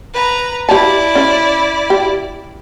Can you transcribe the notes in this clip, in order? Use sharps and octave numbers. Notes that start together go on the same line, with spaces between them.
B4 A#5
E4 G4 D5 A5
C#4 C5
G4